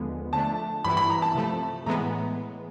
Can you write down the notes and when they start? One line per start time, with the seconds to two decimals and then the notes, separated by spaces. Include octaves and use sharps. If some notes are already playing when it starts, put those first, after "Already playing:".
Already playing: D#2 D3 F3 G#3 B3
0.33 D3 F3 A3 D4 A5
0.84 G2 E3 G3 B3 E4 B5
0.97 B5
1.10 A#5
1.22 A5
1.35 C3 F3 A3
1.86 A2 E3 G#3 B3 A#5